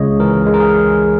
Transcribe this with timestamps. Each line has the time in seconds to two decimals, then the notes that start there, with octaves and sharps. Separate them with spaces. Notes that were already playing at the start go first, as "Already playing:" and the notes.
Already playing: C#2 C#3 G#3 C#5 D#5
0.20 E3 A#4
0.46 G#3
0.54 A#4
0.60 G#4